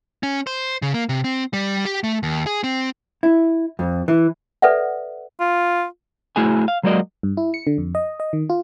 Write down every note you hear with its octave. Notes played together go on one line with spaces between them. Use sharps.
C#4
C5
C#3
A#3
C3
C4
G3
G4
A3
D#2
G#4
C4
E4
F2
E3
A4 B4 D5 E5 F#5
F4
A3 E4 F#4 G#4 G#5
F5
F#3 G#3 A#3 F#4 D5 D#5
G2
E4
C#7
D3
F2
D#5
D#5
D#3
F4